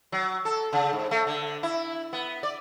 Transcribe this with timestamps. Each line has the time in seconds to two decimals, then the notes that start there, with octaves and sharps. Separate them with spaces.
0.12 F#3
0.45 A4
0.73 C#3
0.93 G#2
1.11 A3
1.27 D3
1.63 E4
2.13 B3
2.43 D5